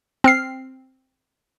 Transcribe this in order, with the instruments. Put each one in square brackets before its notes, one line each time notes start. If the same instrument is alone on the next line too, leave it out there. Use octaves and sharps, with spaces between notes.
[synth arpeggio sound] C4 F6 C7